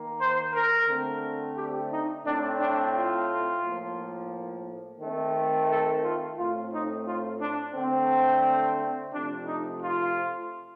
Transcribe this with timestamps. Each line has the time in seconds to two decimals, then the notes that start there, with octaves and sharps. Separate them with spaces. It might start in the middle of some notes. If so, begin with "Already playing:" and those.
Already playing: D#3 A#3
0.20 C5
0.53 A#4
0.88 D3 A3 C4
1.57 G4
1.91 D#4
2.25 A2 A3 C4 D4
2.60 D4
2.94 F4
3.63 A2 F3 A#3
5.00 D#3 A3 C4
5.69 A4
6.03 F4
6.38 A2 A3 C4 F4
6.72 D#4
7.06 F4
7.40 D4
7.75 D3 A3 C4
9.12 C3 F3 A3 C4 D4
9.46 D#4
9.81 F4